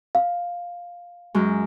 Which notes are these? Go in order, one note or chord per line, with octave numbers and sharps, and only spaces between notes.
F5
F#2 G#3